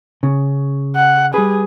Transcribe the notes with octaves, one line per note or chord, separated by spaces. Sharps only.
C#3
F#5
G3 G#4 B4